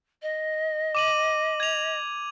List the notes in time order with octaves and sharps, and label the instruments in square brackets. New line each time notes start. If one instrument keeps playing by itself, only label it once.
[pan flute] D#5
[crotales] D6 D#7 F#7
G#6 F7